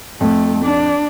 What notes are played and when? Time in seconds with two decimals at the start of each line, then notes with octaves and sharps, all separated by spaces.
0.21 F2 A3
0.64 D4